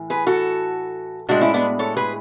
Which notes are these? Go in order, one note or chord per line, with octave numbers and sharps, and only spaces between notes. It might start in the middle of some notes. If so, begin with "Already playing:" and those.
Already playing: A2 E3
G#4 B4
F#4 A4
A2 G#3 D4 F#4
C#4 E4
B3 D4
A4 C#5
G#4 B4